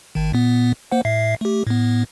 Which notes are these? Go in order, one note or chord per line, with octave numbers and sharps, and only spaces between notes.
G#1 D#3
A#2 B3
A#3 C5 F#5
A2 E5 C7
A3 G4
A2 B3